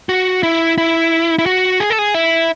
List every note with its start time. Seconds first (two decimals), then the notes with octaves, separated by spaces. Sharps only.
0.09 F#4
0.43 E4
0.78 E4
1.39 E4
1.46 F#4
1.80 G#4
1.90 A4
1.99 G#4
2.14 E4